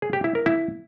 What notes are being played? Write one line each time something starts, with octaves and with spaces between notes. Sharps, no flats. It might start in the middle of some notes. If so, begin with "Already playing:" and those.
G#4
G4
E4
A#4
E4